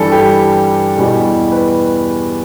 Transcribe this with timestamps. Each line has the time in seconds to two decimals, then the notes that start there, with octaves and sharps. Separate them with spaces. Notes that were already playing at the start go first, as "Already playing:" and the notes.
Already playing: G2 E3 G3 A4
0.12 G4
0.97 E2 B2 G3
1.52 B4